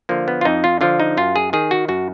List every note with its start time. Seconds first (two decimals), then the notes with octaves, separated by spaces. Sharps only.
0.09 D3 F3 A#3
0.28 B3
0.41 F4
0.45 F2 D#4
0.64 F4
0.81 D3 F3 F4
1.00 D#4
1.17 F#2 F4
1.36 G#4
1.53 D#3 G#4
1.71 F#4
1.88 F#2 F#4